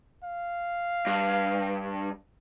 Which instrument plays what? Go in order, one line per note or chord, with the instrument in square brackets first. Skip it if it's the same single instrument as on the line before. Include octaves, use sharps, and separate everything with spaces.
[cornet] F5
[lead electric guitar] G2